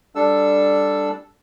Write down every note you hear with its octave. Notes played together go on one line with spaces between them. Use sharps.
G3 D4 A4 E6